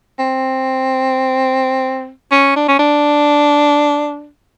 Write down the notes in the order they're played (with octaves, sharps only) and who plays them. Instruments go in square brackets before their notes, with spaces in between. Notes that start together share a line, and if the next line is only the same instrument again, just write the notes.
[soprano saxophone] C4
C#4
D4
C#4
D4